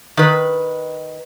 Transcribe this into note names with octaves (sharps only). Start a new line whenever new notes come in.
D#3 B4